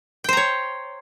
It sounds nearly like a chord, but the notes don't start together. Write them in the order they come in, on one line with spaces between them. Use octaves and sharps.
G5 C5 A#5 C#5